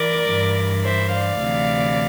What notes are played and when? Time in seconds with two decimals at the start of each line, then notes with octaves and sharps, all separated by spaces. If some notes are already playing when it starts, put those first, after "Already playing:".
Already playing: E3 A#4 D5
0.27 G2 E3
0.84 C5 E5
1.12 D5 F5
1.40 D2 C3 E3